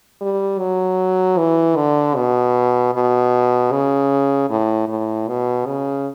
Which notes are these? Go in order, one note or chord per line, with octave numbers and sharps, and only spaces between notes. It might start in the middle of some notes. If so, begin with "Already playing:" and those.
G3
F#3
E3
D3
B2
B2
C#3
A2
A2
B2
C#3